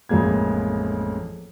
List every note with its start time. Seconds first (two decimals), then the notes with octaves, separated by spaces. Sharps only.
0.09 A1 F2 G#3 A#3 G#6